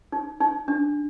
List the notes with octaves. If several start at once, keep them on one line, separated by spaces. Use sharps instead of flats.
D#4
D#4
D4